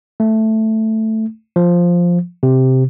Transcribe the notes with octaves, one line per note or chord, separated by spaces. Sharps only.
A3
F3
C3